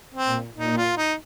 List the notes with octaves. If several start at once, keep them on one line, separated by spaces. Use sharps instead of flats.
C4
A#2
A#2 D#4
F4
D#4